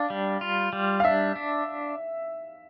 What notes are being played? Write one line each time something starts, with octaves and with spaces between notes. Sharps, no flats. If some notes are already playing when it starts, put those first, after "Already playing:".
Already playing: D4 F5
G3
F4
G3
F5
D4 E5
D4